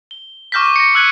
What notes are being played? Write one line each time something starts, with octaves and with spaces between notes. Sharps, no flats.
G7
C#6 D6 F6 G6 A#6 B6
A#6 C#7
E6 F#6 G#6 C#7 D#7